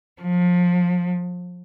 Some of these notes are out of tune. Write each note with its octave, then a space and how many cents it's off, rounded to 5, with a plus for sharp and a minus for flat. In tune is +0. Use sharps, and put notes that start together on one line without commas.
F3 +25